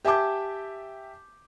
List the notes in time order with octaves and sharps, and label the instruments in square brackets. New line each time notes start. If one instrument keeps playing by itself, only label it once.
[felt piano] G4 E5 G#5 A5 D6 G6